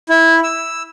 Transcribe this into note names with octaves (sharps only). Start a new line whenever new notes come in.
E4
E6